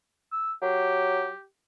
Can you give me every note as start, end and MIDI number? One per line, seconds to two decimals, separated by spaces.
0.32 0.52 88
0.62 1.29 54
0.62 1.44 67